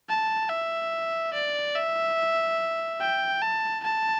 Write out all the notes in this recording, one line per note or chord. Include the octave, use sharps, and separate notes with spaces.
A5
E5
D5
E5
G5
A5
A5